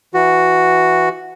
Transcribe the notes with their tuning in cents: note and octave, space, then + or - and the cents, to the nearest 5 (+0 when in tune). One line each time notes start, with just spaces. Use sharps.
E3 +0 F#4 +0